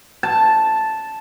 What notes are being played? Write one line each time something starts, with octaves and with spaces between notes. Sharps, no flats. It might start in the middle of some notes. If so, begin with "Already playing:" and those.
A5